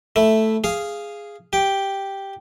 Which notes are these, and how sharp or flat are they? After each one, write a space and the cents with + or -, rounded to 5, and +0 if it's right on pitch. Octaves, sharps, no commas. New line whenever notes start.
A3 +0 E4 +0
G#4 -5 F5 -10
G4 +0 G5 +0